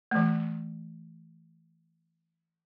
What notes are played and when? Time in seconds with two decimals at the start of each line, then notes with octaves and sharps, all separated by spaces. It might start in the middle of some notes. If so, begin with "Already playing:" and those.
0.11 E3 A3